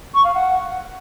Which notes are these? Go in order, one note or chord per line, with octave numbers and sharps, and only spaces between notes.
C#6
F5
F#5